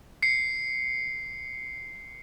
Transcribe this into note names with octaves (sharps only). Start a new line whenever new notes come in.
C7 C#7